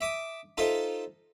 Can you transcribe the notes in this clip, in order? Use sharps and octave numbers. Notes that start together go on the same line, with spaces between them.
E5 D6 D#6
D#4 F4 A4 C5 E5